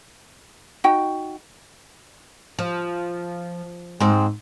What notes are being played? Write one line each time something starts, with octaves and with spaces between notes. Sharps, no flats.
D#4 F#4 G5
F3
G#2 C4